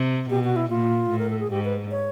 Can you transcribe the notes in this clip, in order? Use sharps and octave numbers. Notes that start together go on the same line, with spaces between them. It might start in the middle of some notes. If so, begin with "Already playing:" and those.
Already playing: C3
B2 G4
F#4
E4
A#2 F4
A2
A#4
A4
G#4
G#2 G4
B4
C#5